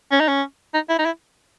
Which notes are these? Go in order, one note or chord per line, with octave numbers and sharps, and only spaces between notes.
C#4
D#4
C#4
D#4
E4
D#4
E4